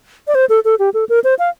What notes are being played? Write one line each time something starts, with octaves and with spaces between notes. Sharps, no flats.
D5
C5
A4
A4
G4
A4
A#4
C5
F5